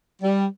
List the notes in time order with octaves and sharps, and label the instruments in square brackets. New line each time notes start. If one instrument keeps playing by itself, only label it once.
[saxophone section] G3